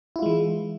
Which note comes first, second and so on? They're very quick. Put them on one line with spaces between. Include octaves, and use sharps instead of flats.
E4 F4 G#3 E3